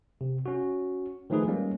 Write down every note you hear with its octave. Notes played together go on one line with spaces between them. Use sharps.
C3
C#4 F#4
D#3 F3 A3 D#4 G#4 B4
G3 G#3 A#3 C#4